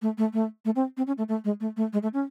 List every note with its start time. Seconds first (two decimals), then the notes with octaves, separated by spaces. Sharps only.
0.02 A3
0.18 A3
0.33 A3
0.65 A3
0.76 C4
0.97 C4
1.07 C#4
1.18 A3
1.28 A3
1.44 G#3
1.60 A3
1.77 A3
1.93 G#3
2.03 A3
2.13 C#4